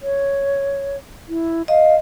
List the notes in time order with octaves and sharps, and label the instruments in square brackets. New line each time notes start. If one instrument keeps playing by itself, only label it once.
[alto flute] C#5
E4
[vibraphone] D#5 [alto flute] F5